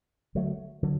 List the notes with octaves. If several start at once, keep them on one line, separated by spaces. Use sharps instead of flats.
D3 F#3 A3
D3 F#3